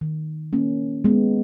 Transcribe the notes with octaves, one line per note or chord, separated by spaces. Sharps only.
D#3
A#3 C#4
G#3 B3